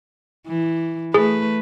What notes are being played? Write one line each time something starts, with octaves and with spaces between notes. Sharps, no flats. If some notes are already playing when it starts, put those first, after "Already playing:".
E3
A3 G#4 B4